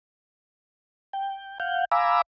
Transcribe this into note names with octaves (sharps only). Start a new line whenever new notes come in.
G5
F5 F#5 G6
F5 G#5 A#5 B5 D6 E6